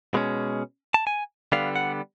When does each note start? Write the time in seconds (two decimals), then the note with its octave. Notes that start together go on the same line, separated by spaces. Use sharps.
0.14 B2 G#3 C#4
0.94 A5
1.07 G#5
1.52 D3 G3 B3 F5
1.75 F#5